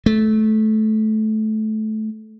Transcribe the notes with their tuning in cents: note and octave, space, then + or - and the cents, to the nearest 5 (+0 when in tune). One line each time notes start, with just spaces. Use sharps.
A3 -20